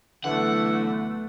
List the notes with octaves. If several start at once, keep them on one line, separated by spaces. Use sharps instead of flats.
B1 D3 E3 A3 F#5